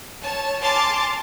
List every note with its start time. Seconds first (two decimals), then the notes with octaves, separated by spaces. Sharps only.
0.23 C#5 A5
0.61 G#5 A5 C6 D6 F6 A6